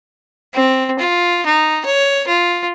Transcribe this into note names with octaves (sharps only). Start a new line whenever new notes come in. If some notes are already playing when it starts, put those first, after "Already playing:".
C4
F4
D#4
C#5
F4